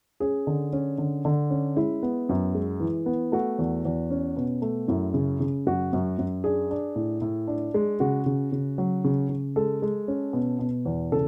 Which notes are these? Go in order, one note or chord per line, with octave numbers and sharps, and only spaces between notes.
C#4 G#4
D3
C#4
D3
D3
C#4
G#3 E4
B3
F#2
G#3
E3
B3
A3 F#4
E2
E2
C#4
B2
A3
F#2 E4
C#3
C#3
F#2 F#4
F#2
F#2
D4 G#4
D4
A2
A2
D4
G#3
C#3 F#4
C#3
C#3
F#3
C#3
C#3
G#3 A4
G#3
C#4
B2
B2
E2
C#3 A4